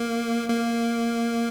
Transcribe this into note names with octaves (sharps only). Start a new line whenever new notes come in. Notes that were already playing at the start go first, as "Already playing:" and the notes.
Already playing: A#3
A#3